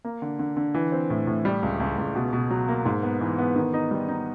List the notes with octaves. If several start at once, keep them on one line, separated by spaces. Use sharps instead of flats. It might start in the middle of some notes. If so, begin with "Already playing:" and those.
A#3
D3
D3
D3
E3
C4
A2
A2
G3
C#2
C#2
C#2
B2
B2
F#3
A#3
G#2
B3
E3
B3
D#3
D#4
G3
D#4